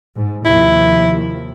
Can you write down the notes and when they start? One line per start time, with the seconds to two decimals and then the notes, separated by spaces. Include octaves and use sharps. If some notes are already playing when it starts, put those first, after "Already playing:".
0.15 G#2
0.45 D#2 C3 F3 E4